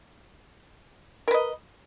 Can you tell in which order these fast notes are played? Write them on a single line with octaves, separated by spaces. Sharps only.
A#4 B4 D#5